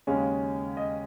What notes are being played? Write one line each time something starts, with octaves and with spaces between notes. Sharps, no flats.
D#2 C#3 G#3 C#4 F5
D#5